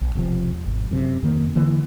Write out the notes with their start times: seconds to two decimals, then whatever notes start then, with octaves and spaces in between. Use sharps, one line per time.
0.01 B1
0.15 E1 C3 F3
0.66 G#1
0.91 F#2 C3
1.23 F2 D#3 A#3
1.55 D3 E3 A#3